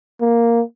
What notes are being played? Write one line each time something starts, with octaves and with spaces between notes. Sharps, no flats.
A#3